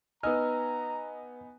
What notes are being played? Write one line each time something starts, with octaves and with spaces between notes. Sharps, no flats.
B3 D#4 B4 D#5 G#5 A#5 E6 F6